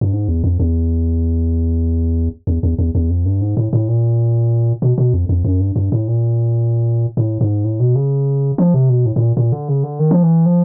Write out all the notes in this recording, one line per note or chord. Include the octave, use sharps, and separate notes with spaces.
G2
G#2
E2
F2
E2
E2
E2
E2
E2
F2
G2
G#2
A2
A2
A#2
B2
B2
F2
F2
F#2
G2
G2
A2
A#2
A2
G#2
A2
B2
C#3
F3
C3
B2
A2
A2
A#2
A#2
D3
C#3
D3
D#3
F3
E3
F3